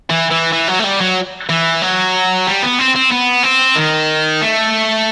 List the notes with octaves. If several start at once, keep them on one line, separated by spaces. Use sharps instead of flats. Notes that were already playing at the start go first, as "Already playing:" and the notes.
E3
E3
E3
F#3
A3
G3
F#3
E3
F#3
G3
B3
C4
C4
B3
C4
D#3
A3